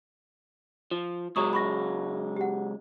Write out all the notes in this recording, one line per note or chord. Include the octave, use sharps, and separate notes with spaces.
F3
C#2 F#3 G#3 A#5 C#6 D#6
B5 C#6 A#6
G4 F#5